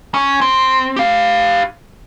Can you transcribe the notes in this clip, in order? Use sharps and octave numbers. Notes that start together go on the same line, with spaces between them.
C#4
C4
G4 F5